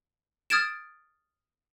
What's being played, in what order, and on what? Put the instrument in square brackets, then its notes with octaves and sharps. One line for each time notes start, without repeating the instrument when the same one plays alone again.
[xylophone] D#6 F6 G#6 A6 D7 E7